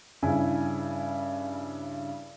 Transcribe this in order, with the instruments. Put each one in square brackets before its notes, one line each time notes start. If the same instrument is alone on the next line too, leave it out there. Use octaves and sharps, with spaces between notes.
[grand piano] G2 C#3 E4 G#5